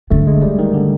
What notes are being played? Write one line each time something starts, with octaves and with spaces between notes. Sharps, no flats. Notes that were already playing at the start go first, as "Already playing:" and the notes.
D3 A3
G#3
G3
D#3
D3